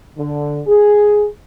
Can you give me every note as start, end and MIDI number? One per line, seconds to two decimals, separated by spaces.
0.18 0.60 50
0.67 1.26 68